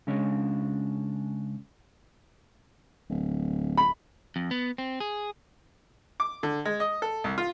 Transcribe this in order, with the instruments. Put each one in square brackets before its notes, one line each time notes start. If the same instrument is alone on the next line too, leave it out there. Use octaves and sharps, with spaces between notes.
[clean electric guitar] C#3 G#3 C#4 D4
[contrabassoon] D1
[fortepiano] B5
[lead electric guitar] F2
B3
C4
G#4
[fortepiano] D6
D3
G#3
D#5
A4
C2
F4